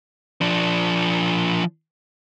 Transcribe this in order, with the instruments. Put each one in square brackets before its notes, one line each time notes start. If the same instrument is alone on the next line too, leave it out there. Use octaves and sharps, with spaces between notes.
[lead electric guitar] F3 D4